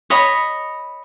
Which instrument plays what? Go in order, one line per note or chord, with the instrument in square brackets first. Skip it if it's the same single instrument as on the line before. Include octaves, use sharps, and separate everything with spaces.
[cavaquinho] C#5 D#5 B5